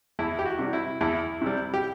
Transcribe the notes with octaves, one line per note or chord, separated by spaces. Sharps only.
E2 E4
G4
F#4
C3 G3
E4
E2 E4
C3 G3
G4